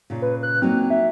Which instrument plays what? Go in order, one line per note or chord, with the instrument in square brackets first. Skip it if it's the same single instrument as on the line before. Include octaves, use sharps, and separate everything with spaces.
[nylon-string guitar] A#2 C#3
[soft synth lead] B4
F#6
[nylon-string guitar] F#3 A#3 D#4 [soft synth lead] C4
[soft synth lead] E5